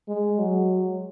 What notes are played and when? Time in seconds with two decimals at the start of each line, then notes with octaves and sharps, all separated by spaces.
0.08 G#3
0.39 F#3